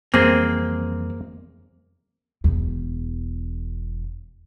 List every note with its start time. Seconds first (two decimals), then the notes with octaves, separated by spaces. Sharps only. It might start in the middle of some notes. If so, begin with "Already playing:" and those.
0.14 F2 E3 G3 A#3 C4 G#4
2.44 E1 E2